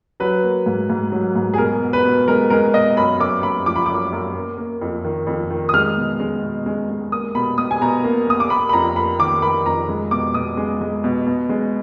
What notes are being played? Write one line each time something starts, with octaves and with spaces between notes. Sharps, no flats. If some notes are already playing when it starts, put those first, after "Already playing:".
F#3 B4
A#3
G#2
G#2
F#3
G#2
G#4
B2 A#4
B2
B4
B2
G#3 A#4
G#3 A#4
B2 D#5
F#2 B5
F#2 D6
F#2 B5
F3 D6
B5
F#2 D6
F#2
A#3
A#3
F2
D#3
F2
D#3
D#6
G#3 F6
B2
G#3
B2
G#3
G#3
A#3 D#6
B2 B5
B2 D#6
G#5
B2 A#5
A#3
A#3 D#6
D6
A#3 B5
B5
F2 A#5
A#3 B5
D#3 D6
D#3 B5
F2 A#5
G#3
B2 D6
B2 D#6
G#3
G#3
B2
B2
G#3